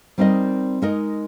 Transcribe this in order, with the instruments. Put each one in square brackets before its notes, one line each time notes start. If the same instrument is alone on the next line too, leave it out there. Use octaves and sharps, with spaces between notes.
[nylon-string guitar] G3 C4 D#4 A#4 D#5
G#3 D#4 A#4 D#5